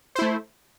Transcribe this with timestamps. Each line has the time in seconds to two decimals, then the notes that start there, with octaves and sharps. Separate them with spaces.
0.15 C5
0.19 E4
0.22 A3